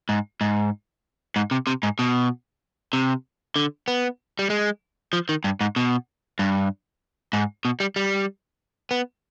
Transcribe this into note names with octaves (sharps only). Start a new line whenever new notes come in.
G#2
G#2
G#2
C3
C3
G#2
B2
C3
D3
B3
G3
G#3
F3
D#3
G2
G#2
B2
G2
G#2
B2
G3
G3
B3